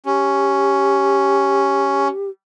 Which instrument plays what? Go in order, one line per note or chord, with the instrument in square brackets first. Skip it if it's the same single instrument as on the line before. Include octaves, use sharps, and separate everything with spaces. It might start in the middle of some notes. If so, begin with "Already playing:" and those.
[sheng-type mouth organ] C#4 [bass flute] G4